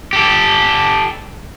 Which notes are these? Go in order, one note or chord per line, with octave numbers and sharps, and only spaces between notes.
G4 A4